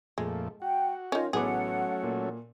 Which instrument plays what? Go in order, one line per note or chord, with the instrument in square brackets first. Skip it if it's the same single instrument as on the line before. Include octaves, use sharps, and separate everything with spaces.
[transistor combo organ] F2 A#2 A3 [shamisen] G#3
[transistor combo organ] F#4 [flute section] F#5 G5
[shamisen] D#3 C#4 [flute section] F4 D#5
[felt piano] A1 B3 D6 [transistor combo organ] F#3 A3 C#4 [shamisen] G#4 [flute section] F#5
[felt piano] A#2